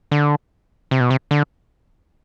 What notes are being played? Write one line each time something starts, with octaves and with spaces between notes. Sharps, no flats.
D3
C3
B2
C3
D3